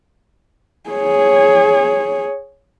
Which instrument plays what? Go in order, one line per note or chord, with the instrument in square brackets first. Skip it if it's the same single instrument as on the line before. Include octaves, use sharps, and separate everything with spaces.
[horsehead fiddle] G#4 C#5